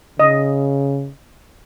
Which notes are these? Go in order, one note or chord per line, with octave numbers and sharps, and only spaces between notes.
C#3 D#5